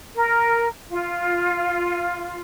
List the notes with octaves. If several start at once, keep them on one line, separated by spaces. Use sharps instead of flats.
A#4
F4